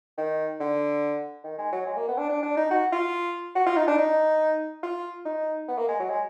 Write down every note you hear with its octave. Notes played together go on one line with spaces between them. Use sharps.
D#3
D3
D#3
G#3
F#3
G#3
A#3
B3
D4
D4
D4
D#4
F#4
F4
F#4
F4
D#4
D4
D#4
F4
D#4
B3
A#3
G#3
F#3
G#3